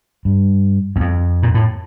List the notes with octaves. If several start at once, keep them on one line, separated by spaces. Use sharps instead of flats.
G2
E2
F2
A#2
A2